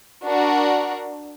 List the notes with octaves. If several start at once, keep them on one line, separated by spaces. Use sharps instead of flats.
D4 F#4 A#4